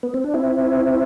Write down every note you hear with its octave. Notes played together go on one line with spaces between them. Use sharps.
B3
C4
D4
C4 E4